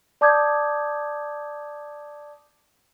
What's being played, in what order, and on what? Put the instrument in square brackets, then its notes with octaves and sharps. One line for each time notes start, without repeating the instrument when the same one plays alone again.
[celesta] D5 A5 D6 D#6 G6 G#6